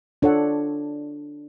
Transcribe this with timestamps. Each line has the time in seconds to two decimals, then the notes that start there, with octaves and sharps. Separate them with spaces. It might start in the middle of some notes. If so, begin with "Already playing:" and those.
0.22 D4 F4 A4 C#5 F#5